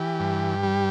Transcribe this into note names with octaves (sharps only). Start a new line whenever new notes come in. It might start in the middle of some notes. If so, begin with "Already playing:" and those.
Already playing: E3 G4
G2
G3